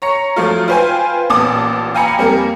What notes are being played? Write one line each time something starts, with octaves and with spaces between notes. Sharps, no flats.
C#5 A#5 C#7
F3 F#3 A3 F4
F4 B4 C5 G5 G#5
A1 A#2 B3 A5 D6 D#6
F5 G5 G#5 A#5 B5 C#7
F2 G3 A#3 A#4